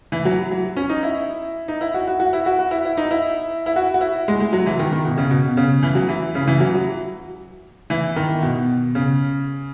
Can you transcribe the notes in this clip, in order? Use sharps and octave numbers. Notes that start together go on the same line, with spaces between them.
E3
F#3
F#3
C#4
D#4
E4
D#4
E4
F#4
F#4
F#4
E4
F#4
F#4
E4
E4
D#4
E4
E4
F#4
F#4
E4
G#3
G#3
F#3
E3
D#3
D#3
B2
C#3
B2
C#3
E3
F#3
E3
C#3
E3
F#3
F#3
E3
D#3
B2
C#3